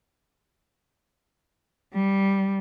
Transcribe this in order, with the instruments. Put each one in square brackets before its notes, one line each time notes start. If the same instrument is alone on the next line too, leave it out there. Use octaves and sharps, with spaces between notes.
[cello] G3